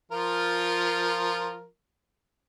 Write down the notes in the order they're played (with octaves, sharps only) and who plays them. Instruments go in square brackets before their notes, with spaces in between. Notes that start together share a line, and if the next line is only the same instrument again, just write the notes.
[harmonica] F3 F4 A#4